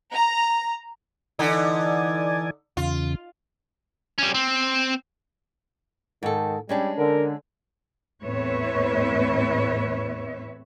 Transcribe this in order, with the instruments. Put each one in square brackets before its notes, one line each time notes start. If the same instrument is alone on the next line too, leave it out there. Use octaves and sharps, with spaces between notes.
[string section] A#5
[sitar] D3 D#4 [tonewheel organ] E3 D5 G#5
[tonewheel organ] E2 C#3 [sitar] F4
[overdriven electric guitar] G3 C#4
C4
[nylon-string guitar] G#2 A4 [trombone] D#3
[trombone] G3 [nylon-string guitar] G#3 C#4 D4
[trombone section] D3 [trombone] A#4
[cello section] E2 A2 C4 B4 C#5 E5